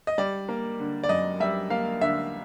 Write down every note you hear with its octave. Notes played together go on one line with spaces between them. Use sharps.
D#5
G3 D5
A#3
D3
D5
F#2 D#5
G3 E5
A#3 F5
D3 E5